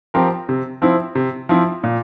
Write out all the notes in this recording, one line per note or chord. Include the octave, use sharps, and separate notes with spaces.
F3 C4 G4 A#4
C3
F3 C4 E4
C3
F3 C4 E4
A#2